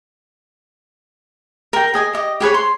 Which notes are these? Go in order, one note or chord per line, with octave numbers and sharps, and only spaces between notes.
A#4 G5
G#4 D#5 G#5
G4 D#5
G4 G#4 B4 C#5
C6